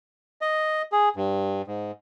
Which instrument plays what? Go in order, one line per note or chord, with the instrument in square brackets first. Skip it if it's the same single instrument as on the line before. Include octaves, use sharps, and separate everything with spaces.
[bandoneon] D#5
G#4
G2
G#2